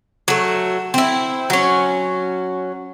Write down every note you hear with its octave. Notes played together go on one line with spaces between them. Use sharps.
F#3 A3
C4 E4
F#3 C#4